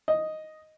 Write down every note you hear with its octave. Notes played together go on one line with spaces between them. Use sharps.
D#5